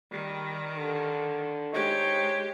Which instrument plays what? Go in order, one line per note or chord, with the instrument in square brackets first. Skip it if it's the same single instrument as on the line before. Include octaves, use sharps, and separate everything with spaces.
[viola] D#3 [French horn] G3
[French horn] D3
[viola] G#3 G4 [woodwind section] D#4 C5 C#5